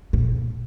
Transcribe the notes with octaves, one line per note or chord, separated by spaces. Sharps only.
A#2